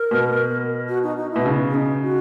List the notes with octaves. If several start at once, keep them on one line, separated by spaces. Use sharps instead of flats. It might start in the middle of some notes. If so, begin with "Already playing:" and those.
Already playing: A#4
B2
F#4
D#4
D#4
B2 E4
C#3
C#4
D#4
F#4